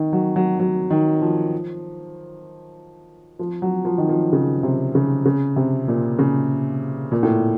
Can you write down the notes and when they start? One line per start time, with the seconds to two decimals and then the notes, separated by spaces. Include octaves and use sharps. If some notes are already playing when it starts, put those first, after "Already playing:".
Already playing: D#3
0.13 F#3
0.36 F#3
0.59 F#3
0.90 D#3
1.21 F3
3.39 F3
3.62 F#3
3.85 F3
3.98 D#3
4.09 F3
4.33 C#3
4.63 C3
4.95 C#3
5.25 C#3
5.56 C3
5.88 A#2
6.19 C#3
7.12 A#2
7.23 A2